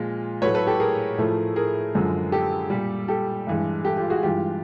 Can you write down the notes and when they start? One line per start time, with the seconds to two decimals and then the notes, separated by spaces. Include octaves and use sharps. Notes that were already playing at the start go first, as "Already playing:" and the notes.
Already playing: A#2 F3 G#3 F4
0.42 A2 F#3 A3 B4 C#5
0.54 A4 B4
0.67 G4 A4
0.80 G#4 A#4
1.18 A2 F3 A3
1.56 G#4 A#4
1.95 F#2 D3 F3 G#3
2.32 G4 A4
2.70 A#2 G3
3.08 G4 A4
3.47 G2 E3 G#3
3.85 G4 A4
3.97 F4 G4
4.10 F#4 G#4
4.23 G2 E3 G#3 F4 G4